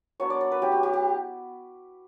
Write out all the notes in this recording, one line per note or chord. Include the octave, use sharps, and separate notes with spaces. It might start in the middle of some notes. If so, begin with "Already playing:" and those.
F#3 B3 D4 C#5
D5
D5
B4
F#3 C#4 E4 G4
G4
G4
G4